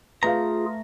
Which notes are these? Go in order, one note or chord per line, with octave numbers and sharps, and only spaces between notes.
A3 F4 G#4 B4 F5 A#5